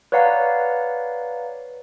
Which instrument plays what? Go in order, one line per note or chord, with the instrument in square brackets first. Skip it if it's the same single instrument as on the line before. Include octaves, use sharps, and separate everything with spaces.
[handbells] B4 C#5 D5 F5 F#5 A#5